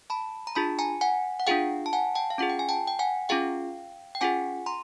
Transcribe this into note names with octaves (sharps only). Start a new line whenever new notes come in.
A5 B5
A#5
D4 F4 G#4 A5 B5
G#5 A#5
F#5 G#5
F#5
D4 F4 G#4 F5 G5
A5
F#5 G#5
G5 A5
F5
C#4 F4 G#4 F#5
G5
G#5
G5 A5
G5
F#5 G#5
C#4 F4 G#4 F5 G5
G5
C#4 F4 G#4 F#5 G#5
A#5 C6